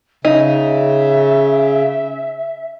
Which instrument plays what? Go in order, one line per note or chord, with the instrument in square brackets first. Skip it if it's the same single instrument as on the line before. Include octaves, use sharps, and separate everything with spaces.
[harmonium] C#3 [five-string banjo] D#4 [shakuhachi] E5